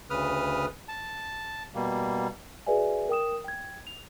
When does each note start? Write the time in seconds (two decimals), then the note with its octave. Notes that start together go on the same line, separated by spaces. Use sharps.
0.10 D2 C#3 B4 D#6 F6
0.88 A5
1.75 B2 G3 A#3
2.67 F#4 G#4 B4 D5 E5 G#5
3.09 A#4 G5 D#6 E7
3.44 G5 G#6
3.87 F7